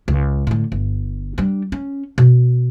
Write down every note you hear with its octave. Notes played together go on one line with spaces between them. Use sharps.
C#2
A2 D3
G1
G3 D4
C#4
B2